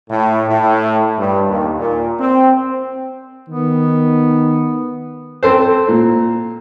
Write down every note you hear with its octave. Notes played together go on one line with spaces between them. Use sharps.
A2
A2
G2
D#2
A#2
C4
D#3 B3
C4 A4 C5
A#2